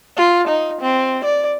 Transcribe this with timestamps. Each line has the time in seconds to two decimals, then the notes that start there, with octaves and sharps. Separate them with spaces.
0.17 F4
0.48 D#4
0.81 C4
1.25 D5